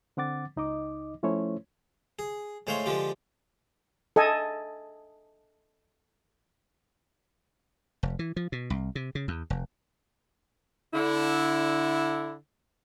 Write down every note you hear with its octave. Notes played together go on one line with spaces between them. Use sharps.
D3 C4 F#5 D6 A6
C#2 D#4 D#5 D6
F3 A3 C#4 E4 C5 C#5
G#4
A2 G#3 C5 C#5 F5 C6
D3 F3 G#3 F4 G4
A4 D#5 G#5
F1
E3
F3
B2
C2
C3
C#3
E2
F1
D3 E4